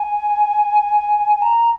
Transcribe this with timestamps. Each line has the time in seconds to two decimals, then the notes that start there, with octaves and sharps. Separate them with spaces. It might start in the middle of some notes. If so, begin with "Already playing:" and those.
Already playing: G#5
1.42 A#5